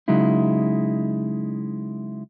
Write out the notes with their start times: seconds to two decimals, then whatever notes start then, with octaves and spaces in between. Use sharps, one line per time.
0.08 C#3 F#3 G#3 D#4 E4